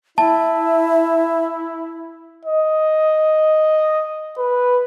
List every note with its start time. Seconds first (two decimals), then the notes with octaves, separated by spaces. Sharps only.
0.18 E4 E5 A5
2.45 D#5
4.38 B4